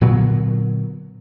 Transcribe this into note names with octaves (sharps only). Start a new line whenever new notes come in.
A#2 D3 F#3 B3